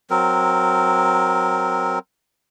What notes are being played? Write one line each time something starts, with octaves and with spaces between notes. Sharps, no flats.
F#3 C4 A#4